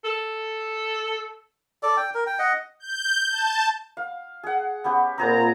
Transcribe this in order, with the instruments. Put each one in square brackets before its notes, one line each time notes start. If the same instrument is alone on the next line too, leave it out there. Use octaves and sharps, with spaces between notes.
[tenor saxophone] A4
[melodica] A4 D5
G5
A#4
G5
D#5 F#5
[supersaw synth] G6
A5
[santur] F5
G#4 F#5
B3 C#4 G4
[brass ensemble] A#2 A#5 [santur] C4 G#4 B4